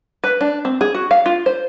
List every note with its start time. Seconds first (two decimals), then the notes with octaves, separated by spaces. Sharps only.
0.24 B4
0.41 D4
0.65 C4
0.81 G#4
0.94 F#4
1.11 F5
1.26 F4
1.46 C5